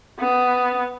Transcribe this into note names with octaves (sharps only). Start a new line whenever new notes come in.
B3